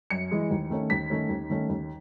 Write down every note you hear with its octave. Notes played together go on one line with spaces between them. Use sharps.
F#2 C#7
E3 G#3
D#2
D#3 A3 C#4
D#2 B6
D#3 A3 C#4
D#2
D#3 A3 C#4
D#2